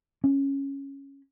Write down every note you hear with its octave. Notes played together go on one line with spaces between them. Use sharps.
C#4